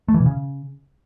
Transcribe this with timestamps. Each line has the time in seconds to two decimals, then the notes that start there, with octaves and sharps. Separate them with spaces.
0.08 A3
0.14 E3
0.20 B2
0.26 C#3